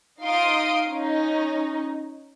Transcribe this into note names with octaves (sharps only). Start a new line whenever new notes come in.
D#4 F4 F5 C6 D#6 D7
C#4 D#4